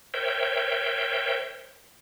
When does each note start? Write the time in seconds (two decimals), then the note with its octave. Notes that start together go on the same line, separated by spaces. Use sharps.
0.14 A#4 C5 C#5 E5 G5